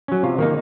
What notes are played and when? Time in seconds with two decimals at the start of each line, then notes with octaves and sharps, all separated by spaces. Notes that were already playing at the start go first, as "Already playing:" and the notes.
0.08 F#3 C#4
0.23 C3 F4
0.38 D#3 A#3 D#4